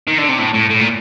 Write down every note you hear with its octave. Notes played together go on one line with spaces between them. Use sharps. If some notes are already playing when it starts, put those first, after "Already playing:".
D#3
D3
C3
A2
A2
A2
A#2